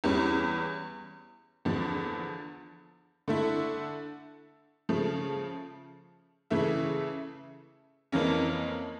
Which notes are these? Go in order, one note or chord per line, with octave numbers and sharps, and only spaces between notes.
E2 E3 G3 C#4
E2 D3 F3
D3 A3 E4
C#3 F3 A3
C#3 E3 A3 E4
F2 E3 A#3 C#4